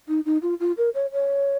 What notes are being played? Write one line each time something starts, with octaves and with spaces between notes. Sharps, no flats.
D#4
D#4
F4
F4
A#4
C#5
C#5